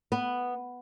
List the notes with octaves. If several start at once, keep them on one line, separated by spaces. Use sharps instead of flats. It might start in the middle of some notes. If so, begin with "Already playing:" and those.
B3